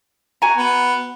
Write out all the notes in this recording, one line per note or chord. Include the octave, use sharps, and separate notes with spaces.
F#4 G#5 A#5
B3